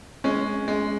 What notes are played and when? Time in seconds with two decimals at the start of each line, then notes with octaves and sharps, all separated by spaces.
0.24 G#3 C#4
0.68 G#3